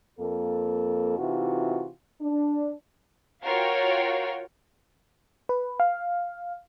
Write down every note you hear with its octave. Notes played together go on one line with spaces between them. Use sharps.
F2 A#3 A4
C3 E3 D#4 F4 F#4
D4
F4 F#4 A#4 C#5 F5 G5
B4
F5